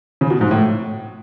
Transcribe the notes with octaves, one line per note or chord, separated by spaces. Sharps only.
C#3
B2
G#2
A2